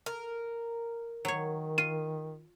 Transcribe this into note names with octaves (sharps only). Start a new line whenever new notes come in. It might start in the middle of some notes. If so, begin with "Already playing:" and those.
A#4
D#3 F#3 C#5
F4 D#7